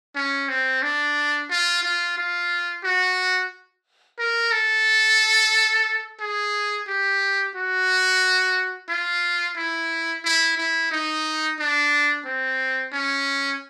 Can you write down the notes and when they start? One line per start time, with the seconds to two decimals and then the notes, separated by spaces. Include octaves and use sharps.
0.15 C#4
0.49 C4
0.82 D4
1.49 F4
1.83 F4
2.17 F4
2.84 F#4
4.19 A#4
4.52 A4
6.20 G#4
6.88 G4
7.55 F#4
8.89 F4
9.56 E4
10.24 E4
10.57 E4
10.91 D#4
11.59 D4
12.25 C4
12.92 C#4